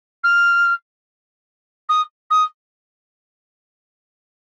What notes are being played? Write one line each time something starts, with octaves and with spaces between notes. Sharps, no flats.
F6
D#6
D#6